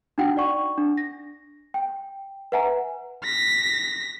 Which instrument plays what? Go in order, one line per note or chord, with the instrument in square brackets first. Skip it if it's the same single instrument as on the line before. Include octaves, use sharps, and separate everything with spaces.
[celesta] D4 D#4 F#4 F#5 G5
D5 F#5 C#6
D4
A#6
G5
B4 E5 F#5 G#5 A#5
[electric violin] A#6 B6